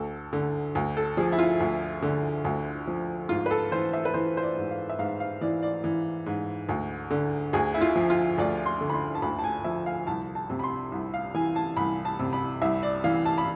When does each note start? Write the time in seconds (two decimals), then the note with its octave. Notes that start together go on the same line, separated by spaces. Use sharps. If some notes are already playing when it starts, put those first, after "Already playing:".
Already playing: D2 A4
0.33 D3
0.75 D2
0.97 A4
1.17 F3 G#4
1.32 E4
1.39 F4
1.60 D2
2.02 D3
2.45 D2
2.87 F3
3.29 G#2 F4
3.46 B4
3.51 A4
3.72 E3 C5
3.93 E5
4.05 B4
4.14 E3 C5
4.37 C5
4.43 D5
4.57 G#2
4.71 F5
4.90 E5
4.99 G#2 F5
5.20 F5
5.41 E3 D5
5.63 D5
5.84 E3
6.26 G#2
6.69 D2
7.10 D3
7.53 D2 G#4
7.74 E4
7.81 F4
7.96 F3
8.10 F4
8.38 D2 D5
8.66 C6
8.81 D3
8.89 B5
8.94 C6
9.15 A5
9.22 D2 B5
9.39 A5
9.44 G#5
9.64 F3 E5
9.86 F5
10.07 C2 A5
10.35 A5
10.50 C3
10.59 B5
10.64 C6
10.92 C2
11.14 F5
11.34 E3 G#5
11.56 A5
11.77 C2 B5
12.05 A5
12.19 C3
12.33 B5
12.62 C2 E5
12.83 D5
13.04 E3 F5
13.25 A5
13.38 B5